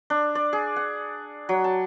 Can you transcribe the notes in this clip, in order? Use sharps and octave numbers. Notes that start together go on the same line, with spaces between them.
D4
D5
G#4
F#5
F#3
A5